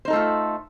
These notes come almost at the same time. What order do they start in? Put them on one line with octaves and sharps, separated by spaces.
C5 D#4 A4 A3 F4